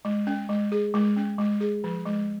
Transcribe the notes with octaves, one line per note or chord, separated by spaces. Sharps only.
G#3
C#4
G#3
G#4
G#3
C#4
G#3
G#4
F3
G#3